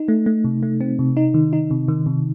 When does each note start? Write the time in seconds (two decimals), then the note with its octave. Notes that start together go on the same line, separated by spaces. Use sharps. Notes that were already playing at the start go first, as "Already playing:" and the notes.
Already playing: D#4
0.08 A3
0.26 A3
0.44 C3
0.63 A3
0.81 C4
0.99 C3
1.17 D#4
1.34 D#3
1.53 D#4
1.71 C3
1.88 D#3
2.06 C3